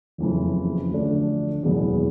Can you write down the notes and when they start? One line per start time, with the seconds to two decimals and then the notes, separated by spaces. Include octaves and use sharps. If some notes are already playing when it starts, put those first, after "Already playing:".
0.18 F#1 F2 C#3 E3
0.90 D2 D3 F3 A3 D4
1.62 F#1 E2 B2 G#3 B3